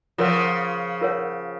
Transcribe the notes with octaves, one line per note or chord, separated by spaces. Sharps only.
C#3 F3 F4 A#4 C#5 F#5
F4 A#4 C#5 F#5